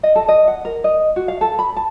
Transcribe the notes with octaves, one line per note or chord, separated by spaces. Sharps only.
D#5
A4
D#5
F#5
A#4
D#5
F#4
F5
A4
B5
A5